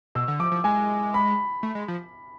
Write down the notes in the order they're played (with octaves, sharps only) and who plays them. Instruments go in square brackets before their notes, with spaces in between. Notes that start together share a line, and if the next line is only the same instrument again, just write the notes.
[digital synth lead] B2 [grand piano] E6
[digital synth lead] D3
[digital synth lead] F3 [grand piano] D6
[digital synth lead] F3
[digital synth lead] G#3 [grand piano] G#5
[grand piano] B5
[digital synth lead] A3
G#3
F3